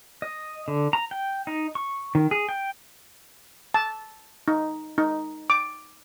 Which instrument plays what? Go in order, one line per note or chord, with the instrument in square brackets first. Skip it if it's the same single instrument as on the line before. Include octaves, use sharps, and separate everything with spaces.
[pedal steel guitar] D#5
D3
A#5
G5
D#4
C#6
D#3
G#4
G5
[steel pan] A5
D#4
D#4
D6